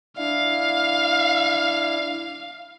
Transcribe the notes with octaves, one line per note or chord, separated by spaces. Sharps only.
D4 E4 F5